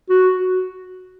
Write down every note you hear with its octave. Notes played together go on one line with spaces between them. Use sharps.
F#4